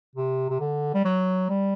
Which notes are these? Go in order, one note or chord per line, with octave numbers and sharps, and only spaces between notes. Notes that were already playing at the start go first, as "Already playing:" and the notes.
C3
C3
D3
G3
F#3
G3